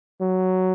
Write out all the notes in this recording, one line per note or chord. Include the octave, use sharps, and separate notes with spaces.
F#3